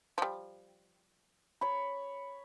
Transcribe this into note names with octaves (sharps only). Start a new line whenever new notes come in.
F3 G3
C#5 B5